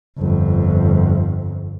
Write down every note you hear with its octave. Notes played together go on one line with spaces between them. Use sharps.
G1 F2